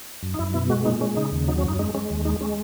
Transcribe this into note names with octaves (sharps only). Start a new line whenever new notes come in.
F#2
D#4
F#2 E4
B2 E4
G#3 F#4
A#2 D#4
G#3 C#4
C#3 D#4
D#2
F#3 D#4
C#4
F#2 D#4
G#3 D#4
G#3 C#4
D#2
G#3 D#4
G#3 C#4